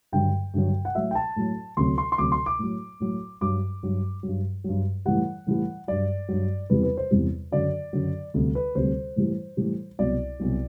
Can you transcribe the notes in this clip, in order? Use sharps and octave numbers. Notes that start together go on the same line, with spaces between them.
G2 D3 F#3 G5
G2 D3 F#3
F#5
A2 F#3 E5
G5
A5
A2 F#3
D2 C3 F#3 C6
C6
C6
D2 C3 F#3 D6
C6
D6
A2 F#3
A2 F#3
G2 F#3 D6
G2 F#3
G2 F#3
G2 F#3
A2 E3 G3 F#5
A2 E3 G3
G2 F#3 D5
G2 F#3
E2 C3 E3 G3 B4
B4
C5
E2 C3 E3 G3
F#2 D3 F#3 D5
F#2 D3 F#3
D2 C3 G3
B4
D2 C3 G3 C5
A2 E3 G3
A2 E3 G3
C2 B2 F#3 D5
C2 B2 F#3